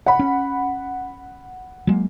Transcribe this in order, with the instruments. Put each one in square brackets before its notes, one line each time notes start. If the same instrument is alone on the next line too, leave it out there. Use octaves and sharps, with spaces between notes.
[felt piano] F#5 B5
[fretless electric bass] C#4
F#3 G#3 A#3